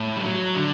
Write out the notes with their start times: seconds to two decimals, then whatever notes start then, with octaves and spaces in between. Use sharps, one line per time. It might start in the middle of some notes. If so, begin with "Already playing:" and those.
Already playing: A2
0.17 G3
0.24 F#3
0.55 D3